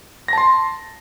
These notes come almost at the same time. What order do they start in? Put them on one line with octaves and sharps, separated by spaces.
A#6 A5 C6